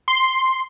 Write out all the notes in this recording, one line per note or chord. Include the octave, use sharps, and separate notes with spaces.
C6